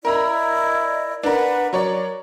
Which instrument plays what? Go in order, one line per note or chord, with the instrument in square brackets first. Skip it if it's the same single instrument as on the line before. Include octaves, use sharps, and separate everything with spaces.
[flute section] E4 D5 D#5 [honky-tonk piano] A#4 A#5 B5
[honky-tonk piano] D4 A#4 [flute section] B4 F#5
[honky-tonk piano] F#3 C#5 D5 [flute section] A#4